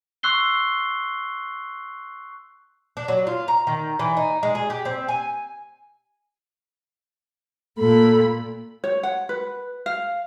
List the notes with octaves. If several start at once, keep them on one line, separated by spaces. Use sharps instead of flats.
C6 C#6 E6 F#6 C7 G7
D4
F#3
F4
A#5
D#3
E3
D#4
G#3
G#4
G4
C4
G#5
A#2 A4 B5
C#5
F#5
B4
F5